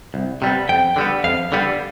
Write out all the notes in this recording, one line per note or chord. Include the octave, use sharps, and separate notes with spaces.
C2
C3 G3 B3
F2 G5
D3 G3 B3
F2 F5
D3 G3 B3